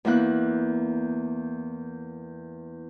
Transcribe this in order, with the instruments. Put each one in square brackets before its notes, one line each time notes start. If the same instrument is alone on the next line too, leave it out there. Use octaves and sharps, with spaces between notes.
[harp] E2 A#3 E4 F#6